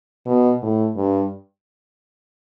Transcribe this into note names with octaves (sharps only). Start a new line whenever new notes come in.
B2
A2
G2